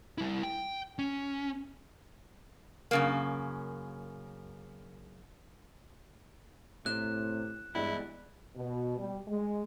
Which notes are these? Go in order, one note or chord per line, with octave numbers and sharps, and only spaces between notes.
G3 E4
G5
C#4
F#2 C#3 A#3
A2 C3 F#6 E7
E2 G2 G3 G#3 E4
B2
G3
G#3